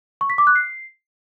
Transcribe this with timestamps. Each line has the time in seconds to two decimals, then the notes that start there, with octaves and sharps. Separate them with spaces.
0.21 C#6
0.30 B6
0.38 D6
0.47 F#6
0.56 C7